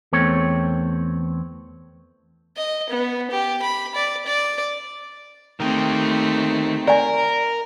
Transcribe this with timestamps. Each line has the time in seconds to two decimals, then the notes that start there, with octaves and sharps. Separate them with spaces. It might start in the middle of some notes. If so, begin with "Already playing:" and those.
0.13 E2 A3 C4 C#5
2.57 D#5
2.90 B3
3.31 G4
3.62 B5
3.95 D5
4.26 D5
5.60 D#3 A3 C4 G4
6.88 A#4 D5 G#5